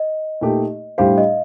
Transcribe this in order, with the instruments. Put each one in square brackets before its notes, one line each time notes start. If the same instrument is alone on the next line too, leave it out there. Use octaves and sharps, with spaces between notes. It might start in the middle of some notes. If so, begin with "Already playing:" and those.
Already playing: [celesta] D#5
[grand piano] A#2 A3 D#4 G4
[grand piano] A2 G3 D4 G4 C5 [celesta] F5
[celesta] D#5